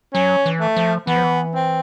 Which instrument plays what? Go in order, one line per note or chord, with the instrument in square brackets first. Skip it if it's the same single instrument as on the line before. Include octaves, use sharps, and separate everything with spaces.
[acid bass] F#3 [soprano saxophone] C#4
[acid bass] E3
[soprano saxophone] A3
[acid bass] F3
[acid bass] E3 [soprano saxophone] B3
[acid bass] F3
E3
[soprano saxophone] C4